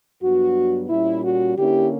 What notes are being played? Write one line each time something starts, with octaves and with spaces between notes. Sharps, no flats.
G2 F#3 B3 D4 F#4
A#2 G3 C#4 E4
F#4
D3 A#3 C#4 E4 G4